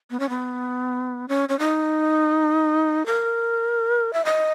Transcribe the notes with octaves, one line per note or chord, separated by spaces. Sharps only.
B3
C#4
B3
C#4
C#4
D#4
A#4
E5
D#5